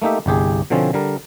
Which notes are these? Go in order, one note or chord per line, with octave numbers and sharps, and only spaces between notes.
A3 A#3 D#4 G4 E5
G1 C2 G4 G#4
B2 D3 F3 C4 C#4
D3 G3 A#4